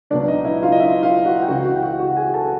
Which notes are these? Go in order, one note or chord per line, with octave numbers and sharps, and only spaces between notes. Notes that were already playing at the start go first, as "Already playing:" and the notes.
C#2 B2 F#3 D4 D5
D#4 D#5
E4 E5
F4 F5
D#5
E4 E5
F4 F5
F#4 F#5
G5
C#2 C#3 E3 F#4 F#5
F#4 F#5
G5
F#4 F#5
F#4 F#5
G#4 G#5
A4 A5